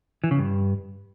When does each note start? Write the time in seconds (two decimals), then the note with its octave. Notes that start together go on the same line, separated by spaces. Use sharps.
0.24 E3
0.31 C#3
0.39 G2